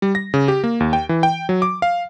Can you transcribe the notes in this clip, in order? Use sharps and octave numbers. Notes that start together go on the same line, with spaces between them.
G3
A#6
C#3
G4
A#3
D#2
G5
E3
G5
F#3
D6
F5